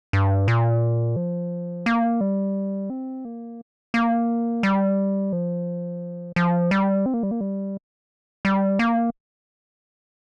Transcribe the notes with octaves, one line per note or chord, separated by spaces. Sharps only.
G2
A#2
F3
A#3
G3
C4
A#3
A#3
G3
F3
F3
G3
C4
A#3
G3
A#3
G3
G3
A#3